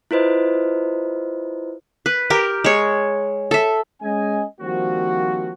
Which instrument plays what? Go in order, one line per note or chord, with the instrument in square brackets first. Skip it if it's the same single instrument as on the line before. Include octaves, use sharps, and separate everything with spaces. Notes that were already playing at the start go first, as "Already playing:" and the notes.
[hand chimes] E4 F4 B4 C5 D#5
[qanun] B4
G4 A#4
G#3 C#5
A4 E5
[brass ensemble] G#3 C#4 D#5 G#5
D#3 F3 G3 A#3 C4 F#4